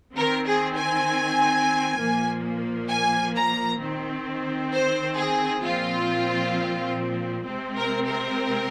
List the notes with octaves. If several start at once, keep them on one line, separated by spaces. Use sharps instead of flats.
D#3 C4 A#4
G#4
G#5
A#2 F3 A#3
G#5
A#5
D#3 C4
C5
G#4
A#2 F3 C4 F4
C3 G#3 C4
A#4
A#4